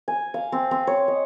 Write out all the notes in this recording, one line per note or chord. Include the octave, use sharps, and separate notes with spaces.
G#5
F5
C4
C4
C#5
D#5